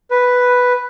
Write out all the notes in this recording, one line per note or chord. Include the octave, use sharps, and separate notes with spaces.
B4